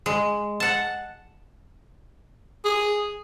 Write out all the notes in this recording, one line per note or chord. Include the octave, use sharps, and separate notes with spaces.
G#3
F#5 A5
G#4